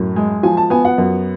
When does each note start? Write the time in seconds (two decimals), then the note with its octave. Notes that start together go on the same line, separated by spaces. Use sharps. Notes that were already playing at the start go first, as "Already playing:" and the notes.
Already playing: F#2 A2
0.16 G#3
0.43 F3 G#5
0.57 A5
0.70 B3 G#5
0.85 F#5
0.98 F#2